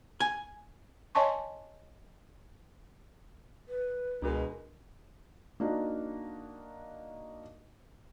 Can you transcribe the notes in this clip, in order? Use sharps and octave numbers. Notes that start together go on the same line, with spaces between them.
G#5
C#5 D#5 G#5 A5 C6 C#6
B4
C#2 B2 G#3 D4 F#4 A#4
A#3 D4 D#4 F#4